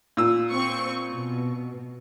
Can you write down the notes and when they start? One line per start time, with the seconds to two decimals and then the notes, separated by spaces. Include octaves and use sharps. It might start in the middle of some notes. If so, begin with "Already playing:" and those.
0.17 A#2 E6
0.52 C4 C#6
1.11 B2